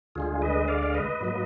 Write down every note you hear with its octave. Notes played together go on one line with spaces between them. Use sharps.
D2 D3 G#3 F4 G#4
B4 D#5
D5 F5
F5
B4 D#5
G#2 F#3 A#3